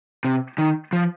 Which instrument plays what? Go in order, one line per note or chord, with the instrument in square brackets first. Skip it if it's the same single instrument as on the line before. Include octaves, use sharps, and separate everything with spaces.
[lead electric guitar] C3
D#3
F3